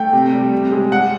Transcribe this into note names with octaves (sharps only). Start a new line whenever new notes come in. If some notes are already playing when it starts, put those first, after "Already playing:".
Already playing: A3 G5
C3
G3
C3
G#3
G3 F#5